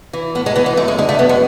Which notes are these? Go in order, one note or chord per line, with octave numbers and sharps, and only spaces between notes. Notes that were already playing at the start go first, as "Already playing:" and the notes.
E3
A2 B3
G#3
E3 B3
G#3
F#2 A3
G#3
D3 G#3
A3
F#2 B3
G#3